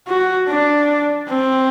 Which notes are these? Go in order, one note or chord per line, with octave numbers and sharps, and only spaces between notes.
F#4
D4
C4